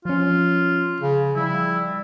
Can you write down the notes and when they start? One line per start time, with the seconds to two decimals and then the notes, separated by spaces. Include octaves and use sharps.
0.05 F3 C#4 F4
1.00 C#3
1.35 F3 G3 E4